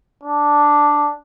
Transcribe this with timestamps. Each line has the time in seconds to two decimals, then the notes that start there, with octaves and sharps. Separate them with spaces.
0.23 D4